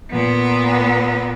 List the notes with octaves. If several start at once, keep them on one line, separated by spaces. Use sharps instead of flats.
A#2 B3